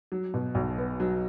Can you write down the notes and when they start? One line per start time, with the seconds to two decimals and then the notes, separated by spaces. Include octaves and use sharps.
0.12 F#3
0.34 B2
0.55 B1
0.78 B3
1.00 F#3